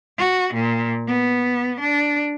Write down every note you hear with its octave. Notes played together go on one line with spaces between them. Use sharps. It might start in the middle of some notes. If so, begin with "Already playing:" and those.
F#4
A#2
B3
D4